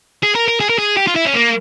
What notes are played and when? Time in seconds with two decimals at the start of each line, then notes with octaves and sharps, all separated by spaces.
0.23 G#4
0.35 A#4
0.48 A#4
0.60 G#4
0.70 A#4
0.79 G#4
0.97 G4
1.07 F4
1.16 E4
1.26 C#4
1.35 A#3